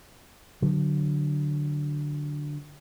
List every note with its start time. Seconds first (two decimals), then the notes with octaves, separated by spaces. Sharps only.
0.62 D3 F#3